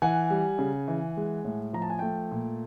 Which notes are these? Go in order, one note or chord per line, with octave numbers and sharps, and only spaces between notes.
E3 F#5 G#5
G3
C#3
E3
G#3
A2
F3 A#5
A5
G#5
A3 G5 A5
A#2